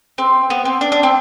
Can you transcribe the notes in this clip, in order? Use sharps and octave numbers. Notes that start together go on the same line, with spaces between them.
C4
B3
C4
D4
D4
C4